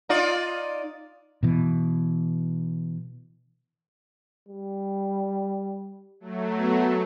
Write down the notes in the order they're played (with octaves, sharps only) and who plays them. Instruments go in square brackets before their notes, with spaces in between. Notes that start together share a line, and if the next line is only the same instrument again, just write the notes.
[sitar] D#4 F4 D5
[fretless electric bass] B2 E3
[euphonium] G3
[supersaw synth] F#3 A3
[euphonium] B3